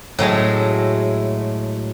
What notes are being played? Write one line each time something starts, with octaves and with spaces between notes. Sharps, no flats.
A2 F#3 G#3 A3